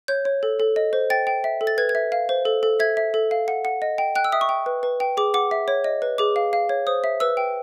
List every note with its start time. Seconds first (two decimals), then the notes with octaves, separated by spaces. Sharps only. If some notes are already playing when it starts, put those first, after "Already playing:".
0.08 C#5 G6
0.25 C#5
0.43 A4
0.60 A4
0.76 D#5
0.93 C5
1.10 G5 A6
1.27 G5
1.44 E5
1.61 A4
1.67 A6
1.78 B4 G#6
1.89 G#6
1.95 E5
2.12 F5
2.29 C5
2.45 A4
2.63 A4
2.80 E5 G#6
2.97 E5
3.14 A4
3.31 F5
3.48 F#5
3.65 F#5
3.82 D#5
3.98 G5
4.15 G5 F#6
4.24 E6
4.32 E5 D#6
4.41 C#6
4.49 G5
4.66 B4
4.83 B4
5.00 G5
5.17 G#4 D6
5.34 F#5 D6
5.51 E5
5.68 C#5
5.84 D#5
6.02 B4
6.18 G#4 D6
6.36 F5
6.53 F5
6.69 C#5
6.87 C5 D#6
7.04 E5
7.20 B4 E6
7.37 G5